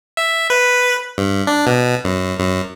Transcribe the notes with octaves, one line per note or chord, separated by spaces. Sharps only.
E5
B4
G2
D4
B2
F#2
F#2